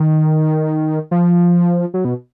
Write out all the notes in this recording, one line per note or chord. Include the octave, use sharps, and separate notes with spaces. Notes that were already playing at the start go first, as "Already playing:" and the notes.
Already playing: D#3
F3
F#3
B2